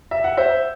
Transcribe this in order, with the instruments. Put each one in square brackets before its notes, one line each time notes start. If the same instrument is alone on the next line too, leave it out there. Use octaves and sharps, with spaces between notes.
[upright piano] E5
F#5
C5 E5